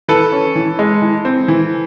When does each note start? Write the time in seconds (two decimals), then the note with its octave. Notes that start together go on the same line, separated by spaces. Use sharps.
0.08 E3 A4 B4
0.32 C#4
0.55 E3
0.79 G#3
1.02 E3
1.25 C4
1.48 E3